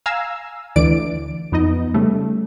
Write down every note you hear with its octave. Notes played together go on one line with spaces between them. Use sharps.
F5 G#5 A#5 E6
D2 E3 D5 D7
F2 B3 D#4 D#5
C#3 G3 A3